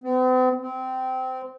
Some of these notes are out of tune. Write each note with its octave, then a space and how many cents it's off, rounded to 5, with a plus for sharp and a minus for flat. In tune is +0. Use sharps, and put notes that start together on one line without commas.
C4 -45
C4 -20